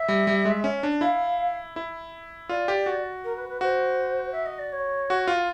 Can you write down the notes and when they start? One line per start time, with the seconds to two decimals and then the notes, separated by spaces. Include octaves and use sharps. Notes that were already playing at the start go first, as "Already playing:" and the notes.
Already playing: E5
0.08 G3
0.27 G3
0.45 G#3
0.64 C#4
0.83 D4
1.01 E4 F5
1.76 E4
2.49 F4 D5
2.68 G4
2.86 F#4
3.24 A#4
3.36 B4
3.48 B4
3.61 F#4 C5
4.32 E5
4.45 D#5
4.59 D5
4.72 C#5
5.10 F#4
5.27 F4